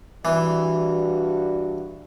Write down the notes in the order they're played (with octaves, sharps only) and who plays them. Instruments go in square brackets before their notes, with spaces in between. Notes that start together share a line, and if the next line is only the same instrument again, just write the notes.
[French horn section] G2 F#4 D5 [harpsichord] E3